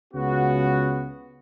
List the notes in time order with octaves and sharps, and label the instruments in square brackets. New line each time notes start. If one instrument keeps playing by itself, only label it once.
[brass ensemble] C#2 C#3 B3 F#4